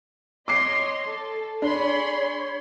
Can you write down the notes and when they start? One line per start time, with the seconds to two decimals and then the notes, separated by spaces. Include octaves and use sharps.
0.48 C#5 D#5 C6 D6 C7
1.06 A4
1.62 D4 G#4 C#5 B5 C6